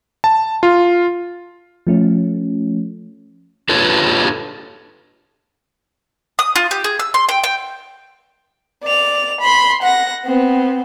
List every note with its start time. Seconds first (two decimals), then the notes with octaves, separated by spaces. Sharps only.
0.24 A5
0.63 F4
1.87 F3 A3 C#4
3.69 D4 F4 A4 B4 C#5
6.39 D#6
6.56 F4
6.71 G4
6.84 G#4
6.99 E6
7.14 C6
7.29 G5
7.44 G5
8.84 D5 F7
9.41 B5 C6
9.83 F#5 A#6
10.25 B3 C4